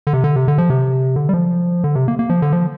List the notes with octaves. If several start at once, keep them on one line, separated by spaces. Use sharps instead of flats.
D3
C3
D3
C3
D3
F3
C3
D3
G3
F3
D3
C3
A#3
A#3
F3
D3
F3